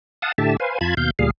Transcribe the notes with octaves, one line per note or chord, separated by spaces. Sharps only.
F5 F#5 A5 D#6
A2 D3 G4 E5 A5
B4 C5 F5 G#5
F2 F4 A5 B5 G#6
D#2 B2 F5 G6
D2 A#2 G3 G#4 F5